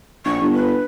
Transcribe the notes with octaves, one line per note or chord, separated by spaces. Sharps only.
A#1 C#6
G1
B4